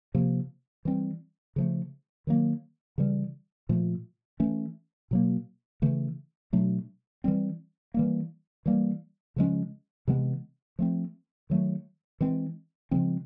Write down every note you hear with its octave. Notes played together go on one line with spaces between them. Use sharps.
C3 F3 A#3
E3 G3 C4
C#3 F3 A3
D#3 F#3 A#3
C#3 E3 G3
A#2 F3 A3
E3 A3 C#4
B2 F#3 A#3
C#3 E3 A3
B2 F#3 A3 D4
E3 G3 C4
E3 G3 A#3
E3 G3 A#3
C#3 F3 G#3 C#4
C3 E3 G#3 B3
F3 A3 C4
D#3 F#3 A3
E3 G#3 C4
C#3 F3 G#3 C4